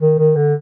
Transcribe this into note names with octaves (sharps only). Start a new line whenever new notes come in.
D#3
D#3
D3